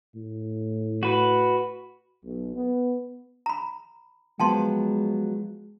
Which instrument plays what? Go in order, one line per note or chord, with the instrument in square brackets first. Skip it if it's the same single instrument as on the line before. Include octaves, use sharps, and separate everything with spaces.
[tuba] A2
[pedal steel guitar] F#4 B4
[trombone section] B1
B3
[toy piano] A#5 B5
[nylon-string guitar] F3 F#3 B3 [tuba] G#3 [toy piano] G5 A5 C6